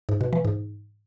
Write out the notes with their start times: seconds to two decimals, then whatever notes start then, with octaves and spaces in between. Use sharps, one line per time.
0.09 G#2
0.21 B2
0.33 E3
0.45 G#2